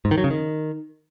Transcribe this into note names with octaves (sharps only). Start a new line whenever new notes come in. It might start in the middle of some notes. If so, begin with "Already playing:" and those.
G#2
D#3
F#3
C#3
D#3